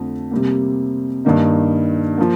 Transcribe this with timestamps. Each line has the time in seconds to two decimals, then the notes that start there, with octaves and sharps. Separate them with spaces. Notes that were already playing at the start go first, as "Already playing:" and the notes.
Already playing: F2 D3 A3
0.31 C3 G3 A#3
1.25 G2 D#3 A#3 D#4
2.18 F3 A#3